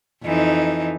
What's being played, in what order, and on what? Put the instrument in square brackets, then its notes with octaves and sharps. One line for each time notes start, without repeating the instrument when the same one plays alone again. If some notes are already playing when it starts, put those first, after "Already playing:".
[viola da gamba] F2 E3 D#4